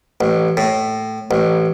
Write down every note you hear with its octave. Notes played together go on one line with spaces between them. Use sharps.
A1
A2
A1